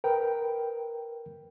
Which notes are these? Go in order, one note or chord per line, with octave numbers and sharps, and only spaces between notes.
A#4 B4 G5